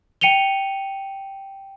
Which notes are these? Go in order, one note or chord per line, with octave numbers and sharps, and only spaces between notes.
G5 C#7 D#7 F7 G7